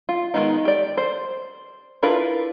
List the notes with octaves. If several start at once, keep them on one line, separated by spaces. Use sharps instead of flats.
F4
D#3 F3 G#3 B3 D#4
G4 D5
C5
D4 E4 F4 A#4 B4